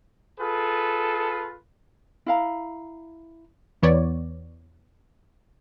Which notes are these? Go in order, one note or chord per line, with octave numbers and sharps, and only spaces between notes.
F4 G#4 A4 B4
E4 F5 A#5
E2 E3 B3 C#5 D5